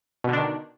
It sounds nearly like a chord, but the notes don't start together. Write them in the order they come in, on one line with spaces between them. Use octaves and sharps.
B2 D3 D4 D#3